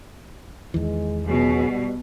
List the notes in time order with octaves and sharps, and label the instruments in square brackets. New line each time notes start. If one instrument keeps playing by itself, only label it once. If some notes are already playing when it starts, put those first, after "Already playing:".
[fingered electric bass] E2 D#3 E3 [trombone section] G#3
[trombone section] C#2 F#3 G#4 [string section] B2
[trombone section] G3